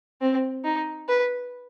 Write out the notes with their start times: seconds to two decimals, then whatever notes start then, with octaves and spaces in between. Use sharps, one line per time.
0.21 C4
0.64 D#4
1.08 B4